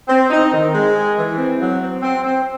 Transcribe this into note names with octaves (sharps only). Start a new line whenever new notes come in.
C4
D#4
D#3
G#3
G#4
E3
C4
F#3
C4
C4
C4